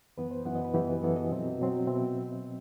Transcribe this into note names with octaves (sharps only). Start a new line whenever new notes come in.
F#2 E3 B3 B4
C5
F#2 E3 B3 F#5
D#5
B4
F#2 E3 B3 G4
F#2 E3 B3 A4
D#5
B2 F#3 C4
B2 F#3 C4
B2 C4 E5